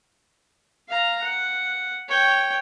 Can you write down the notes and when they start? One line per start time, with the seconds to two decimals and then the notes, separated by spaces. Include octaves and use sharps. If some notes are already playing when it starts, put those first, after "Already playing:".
0.89 F5 A#5
1.22 F#5
2.08 C#5 G5